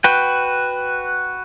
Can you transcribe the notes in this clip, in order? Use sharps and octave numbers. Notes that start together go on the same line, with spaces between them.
F#4 B4 G5